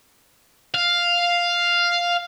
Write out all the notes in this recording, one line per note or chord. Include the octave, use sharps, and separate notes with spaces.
F5